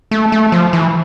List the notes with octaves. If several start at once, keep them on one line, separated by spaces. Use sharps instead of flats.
A3
A3
F3
E3